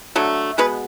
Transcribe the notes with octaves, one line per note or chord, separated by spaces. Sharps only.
D3 F#3 A3
B2 G#3 B3 B4